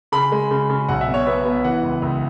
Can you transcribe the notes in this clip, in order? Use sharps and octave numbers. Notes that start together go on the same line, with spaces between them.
C#3 B5
G#3
C#3
C#3
B1 F#5
E5
B2
C#5
B3 E5
B3
E3 F#5
C#2
C#2